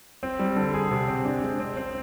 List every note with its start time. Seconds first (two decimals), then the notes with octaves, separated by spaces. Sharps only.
0.23 C4
0.39 G3
0.56 D3
0.74 G#4
0.91 C3
1.08 C4
1.25 D4
1.43 G#3
1.60 C4
1.77 C4